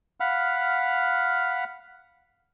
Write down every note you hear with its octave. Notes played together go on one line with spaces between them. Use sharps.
F5 F#5 B5 F6